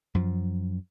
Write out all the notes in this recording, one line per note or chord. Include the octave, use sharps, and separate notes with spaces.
F#2 F3